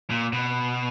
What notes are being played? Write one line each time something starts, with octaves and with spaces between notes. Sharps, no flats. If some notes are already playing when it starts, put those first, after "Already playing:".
A#2
B2